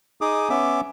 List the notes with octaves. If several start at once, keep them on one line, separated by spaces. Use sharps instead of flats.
D#4 G#4 D6 D#6
B3 C#4 E5 D6